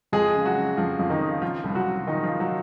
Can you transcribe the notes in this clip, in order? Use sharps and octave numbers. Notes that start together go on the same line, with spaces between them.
F2 G#3 G#4
C#3
F#3 F#4
C#3
F2 F3 F4
F2
D#3 D#4
C#3
F3 F4
C2
F#3 F#4
C2
A#2 D#3 D#4
A#2 F3 F4
F#3 F#4